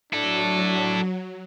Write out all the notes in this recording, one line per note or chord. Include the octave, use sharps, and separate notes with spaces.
F#3 D4 E4 A4